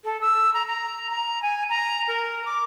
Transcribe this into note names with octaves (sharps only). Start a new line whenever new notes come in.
A4
E6
A#5
A#5
A#5
G#5
A#5
A#4
D6